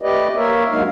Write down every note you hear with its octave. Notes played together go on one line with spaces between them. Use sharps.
A3 G4 B4 D5 D#5
A#3 A#4 C#5 E5
G2 F#3 G#3 A#3 D#4 F5